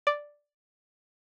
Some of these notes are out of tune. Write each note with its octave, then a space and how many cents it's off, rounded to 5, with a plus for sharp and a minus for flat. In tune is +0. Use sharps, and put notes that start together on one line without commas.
D5 +0 D6 +0